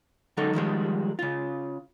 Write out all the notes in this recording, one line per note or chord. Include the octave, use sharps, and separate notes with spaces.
D3 F#3 G#3 D#4 A4
D#3 F3 G3 G#3
C#3 F4